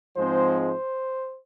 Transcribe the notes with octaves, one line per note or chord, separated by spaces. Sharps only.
G#2 F3 G#3 C4 C5
C5